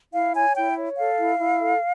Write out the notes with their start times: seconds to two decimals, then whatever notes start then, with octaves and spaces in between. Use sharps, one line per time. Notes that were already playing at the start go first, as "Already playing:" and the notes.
0.13 E4 F5
0.34 C#5 G#5
0.55 E4 G5
0.76 C#5
0.97 A4 F5
1.19 E4
1.39 E4
1.61 A4